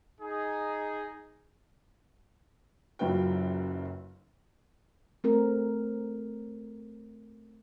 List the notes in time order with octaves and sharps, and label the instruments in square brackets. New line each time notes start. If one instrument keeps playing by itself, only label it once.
[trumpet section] D#4 G#4
[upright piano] F#1 F#2 F#3 F4 B4 G5
[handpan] A3 C4 A#4